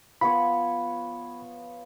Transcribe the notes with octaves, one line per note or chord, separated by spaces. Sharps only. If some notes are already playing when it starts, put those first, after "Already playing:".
F3 B3 C#5 B5